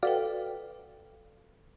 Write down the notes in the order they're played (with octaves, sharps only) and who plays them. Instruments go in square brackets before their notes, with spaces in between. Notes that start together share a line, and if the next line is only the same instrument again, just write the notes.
[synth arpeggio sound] F#4 D5 F5 [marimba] A4 B4 G5